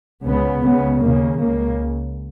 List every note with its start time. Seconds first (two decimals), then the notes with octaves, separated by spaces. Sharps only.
0.24 C#2 C#3 B3
0.64 C#2 C#3 B3
1.03 D#2 C#3 A#3
1.42 C#2 C#3 A#3